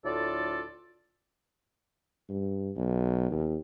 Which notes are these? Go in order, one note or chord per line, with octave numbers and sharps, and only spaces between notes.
D2 A2 F4 A4 D5
G2
B1
D#2